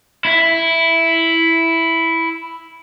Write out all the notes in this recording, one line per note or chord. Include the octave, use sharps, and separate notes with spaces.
E4 E5